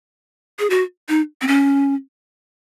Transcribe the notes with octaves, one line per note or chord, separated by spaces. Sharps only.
G#4
F#4
D#4
C4
C#4